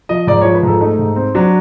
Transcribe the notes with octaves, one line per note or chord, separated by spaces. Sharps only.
F3 D#5
G#2 D5
F3 C#5
B4
G#2 A4
A3 D#4
G#2
C4
F#3 D4